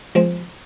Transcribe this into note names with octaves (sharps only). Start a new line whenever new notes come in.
F3 G#3 C4